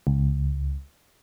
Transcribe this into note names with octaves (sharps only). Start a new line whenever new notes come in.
C#2